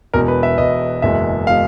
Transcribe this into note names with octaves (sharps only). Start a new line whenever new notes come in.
E1 E2 B2 A#4
B4
E5
E1 E2 B2 D#5
F#1 E2 B2 G#3 E5
B2 G#3 F5